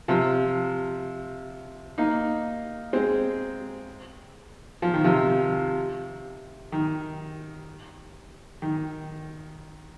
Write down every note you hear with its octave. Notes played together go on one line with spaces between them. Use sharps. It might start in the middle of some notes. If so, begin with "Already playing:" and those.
C3 F3
A#3 D#4
G#3 C4
F3
D#3
C3 F3
D#3
D#3